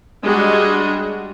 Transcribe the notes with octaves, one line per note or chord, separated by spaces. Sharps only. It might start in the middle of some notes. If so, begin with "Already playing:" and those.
G3 G#3 D4 F#4